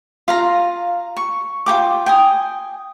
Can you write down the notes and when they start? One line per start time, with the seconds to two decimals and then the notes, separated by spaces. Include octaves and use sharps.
0.28 F4 F5 A#5
1.17 C#6
1.66 F4 A4 G5 D6
2.06 G5 G#5 D#6